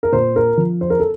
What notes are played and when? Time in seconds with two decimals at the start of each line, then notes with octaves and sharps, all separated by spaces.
0.03 A#4
0.12 A#2 C5
0.36 A#4
0.57 F3
0.81 C5
0.90 A#4
1.00 A4